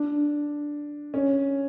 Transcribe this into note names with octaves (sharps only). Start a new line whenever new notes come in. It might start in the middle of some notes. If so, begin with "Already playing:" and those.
Already playing: D4
C#4